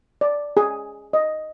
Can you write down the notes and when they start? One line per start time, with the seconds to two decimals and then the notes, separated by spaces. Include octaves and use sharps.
0.21 D5
0.57 G#4
1.13 D#5